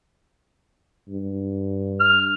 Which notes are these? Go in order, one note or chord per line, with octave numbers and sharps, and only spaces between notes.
G2
F6